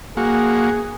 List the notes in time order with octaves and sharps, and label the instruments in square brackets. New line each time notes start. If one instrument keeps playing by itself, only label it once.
[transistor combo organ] A#3 F#4 [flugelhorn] G#4